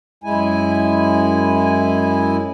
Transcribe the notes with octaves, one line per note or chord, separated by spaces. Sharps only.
F#2 G#3 E4 G#5